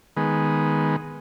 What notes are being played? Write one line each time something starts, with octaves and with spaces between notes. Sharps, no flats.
D#3 G#3 B3